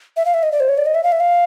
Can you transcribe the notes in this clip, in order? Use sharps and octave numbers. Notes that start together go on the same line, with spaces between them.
E5
F5
E5
D#5
D5
C5
C#5
D5
D#5
E5
F5
E5
F5